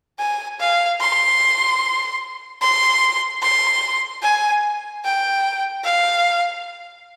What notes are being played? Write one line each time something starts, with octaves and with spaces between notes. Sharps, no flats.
G#5
F5
C6
C6
C6
G#5
G5
F5